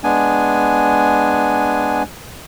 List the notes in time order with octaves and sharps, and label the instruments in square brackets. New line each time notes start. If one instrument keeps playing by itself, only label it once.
[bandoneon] G#3 B3 D4 G#5